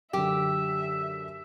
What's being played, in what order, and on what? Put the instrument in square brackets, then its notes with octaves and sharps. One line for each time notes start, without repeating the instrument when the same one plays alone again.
[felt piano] F#2 D3 [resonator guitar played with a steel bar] G4 [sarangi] E5